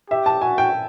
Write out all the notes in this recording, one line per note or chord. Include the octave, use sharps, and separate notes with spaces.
G4 E5
A5
F#4 G#5
G5